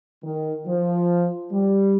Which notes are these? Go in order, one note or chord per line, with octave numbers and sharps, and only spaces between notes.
D#3
F3
G3